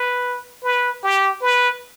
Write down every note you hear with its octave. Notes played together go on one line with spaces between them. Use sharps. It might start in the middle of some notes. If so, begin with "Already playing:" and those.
Already playing: B4
B4
G4
B4